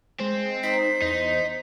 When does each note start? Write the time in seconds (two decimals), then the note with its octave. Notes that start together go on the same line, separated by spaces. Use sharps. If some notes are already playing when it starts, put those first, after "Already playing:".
0.20 G#3 C4
0.63 D#4 C5 B6
1.02 E2 D#4